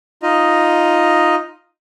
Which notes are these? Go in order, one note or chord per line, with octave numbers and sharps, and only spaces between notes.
D#4 F4 D#5